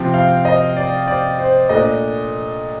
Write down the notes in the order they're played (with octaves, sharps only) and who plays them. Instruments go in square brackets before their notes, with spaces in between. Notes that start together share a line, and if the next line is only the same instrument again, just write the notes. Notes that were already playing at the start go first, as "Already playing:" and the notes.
Already playing: [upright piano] C3 F3 C4 G5
F5
D#5
D5
D5
C5
A#2 A3 D4 D#5